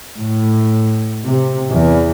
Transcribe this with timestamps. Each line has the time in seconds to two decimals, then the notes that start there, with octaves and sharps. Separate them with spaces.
0.18 A2
1.25 C3
1.72 E2